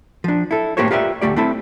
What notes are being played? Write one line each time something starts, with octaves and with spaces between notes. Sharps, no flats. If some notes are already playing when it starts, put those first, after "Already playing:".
F3 D4
E4 A4
A2 A#3 G4 A#4 C5 C#5
F4 G4 A#4 B4 D5 E5
D2 D#3 A3 G4 D5
A3 C4 E4 A4